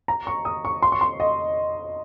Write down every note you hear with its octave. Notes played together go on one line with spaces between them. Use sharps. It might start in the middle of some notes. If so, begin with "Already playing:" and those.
A#5
C#6
D#6
C#6
C6
C#6
C6
D#5